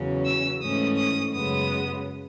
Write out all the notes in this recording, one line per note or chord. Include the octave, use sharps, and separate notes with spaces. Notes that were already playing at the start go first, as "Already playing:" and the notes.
Already playing: E2 C#3 F#3 C#4
E6
G#2 E3 A3 C#4 D#6
D#6
F#2 C#3 G#3 B3 D#6